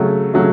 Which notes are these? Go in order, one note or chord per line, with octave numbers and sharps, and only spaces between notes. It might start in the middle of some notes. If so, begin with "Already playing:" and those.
Already playing: C#3 F#3 A3
C#3 F#3 A3